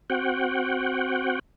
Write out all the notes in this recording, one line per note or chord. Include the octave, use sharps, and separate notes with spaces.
C4 F#4 F#5 G5